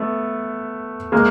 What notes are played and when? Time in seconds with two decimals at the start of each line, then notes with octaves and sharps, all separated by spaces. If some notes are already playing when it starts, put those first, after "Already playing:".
Already playing: A3 B3
1.12 G#3 A#3